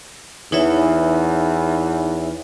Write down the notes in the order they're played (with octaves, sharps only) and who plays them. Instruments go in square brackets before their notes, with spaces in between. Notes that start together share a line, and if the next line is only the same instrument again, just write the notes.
[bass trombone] E2 [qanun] E3 [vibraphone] D#4 C#5 E5